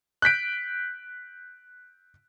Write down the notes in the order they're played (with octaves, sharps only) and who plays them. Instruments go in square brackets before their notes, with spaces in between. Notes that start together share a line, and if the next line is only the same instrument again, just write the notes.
[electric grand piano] F#6 G6 B6 D7